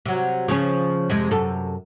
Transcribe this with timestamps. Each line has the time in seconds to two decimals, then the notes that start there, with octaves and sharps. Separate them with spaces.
0.06 C3 F#3
0.48 C#3 F3 C#4
1.10 F2 C3 G#3
1.31 F#2 C3 A4